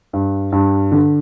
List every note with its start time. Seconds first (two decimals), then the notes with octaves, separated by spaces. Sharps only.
0.13 G2
0.52 G2
0.92 D3